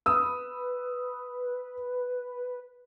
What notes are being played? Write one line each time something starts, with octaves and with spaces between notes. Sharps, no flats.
B4 D#6 E6